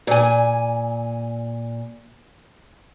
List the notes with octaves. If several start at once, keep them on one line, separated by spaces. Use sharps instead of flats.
A#2 G#5